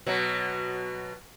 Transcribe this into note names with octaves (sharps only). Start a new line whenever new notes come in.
B2 F#3